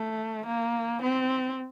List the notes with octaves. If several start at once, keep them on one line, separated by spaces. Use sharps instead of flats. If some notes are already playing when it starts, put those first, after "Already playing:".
Already playing: A3
A#3
C4